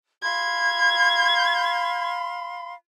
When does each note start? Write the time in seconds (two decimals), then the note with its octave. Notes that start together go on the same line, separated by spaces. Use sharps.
0.23 F5 B5 C6 G#6